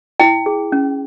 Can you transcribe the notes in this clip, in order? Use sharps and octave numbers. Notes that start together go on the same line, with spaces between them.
E4 G5
G#4
C#4